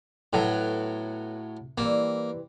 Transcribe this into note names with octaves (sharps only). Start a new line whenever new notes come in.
A2 F#3 B3 A4
E3 G3 A#3 C4